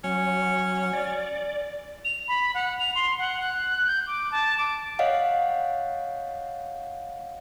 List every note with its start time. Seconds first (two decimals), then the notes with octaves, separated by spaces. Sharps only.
0.04 F#3 C#4
0.93 D5
2.04 F7
2.28 B5
2.54 F#5
2.79 F7
2.95 C6
3.18 F#5
3.41 F#6
3.86 G6
4.07 D6
4.32 A5
4.57 D6
4.99 C#5 D#5 F5 F#5